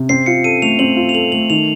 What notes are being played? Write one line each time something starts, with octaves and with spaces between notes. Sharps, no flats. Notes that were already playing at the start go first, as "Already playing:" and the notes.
Already playing: C3
C4 C7
F4 C#7
A4 D#7
A3 F7
C4 F#7
F4
F7
A4 F#7
A3 F#7
D#3 F7